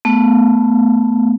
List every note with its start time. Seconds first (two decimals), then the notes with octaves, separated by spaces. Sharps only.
0.05 A3 B3